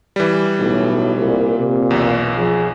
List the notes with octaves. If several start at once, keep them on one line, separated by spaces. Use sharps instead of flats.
E3 G3
B1 A2
C2 A#2
C3
B1 E2
F3 G#4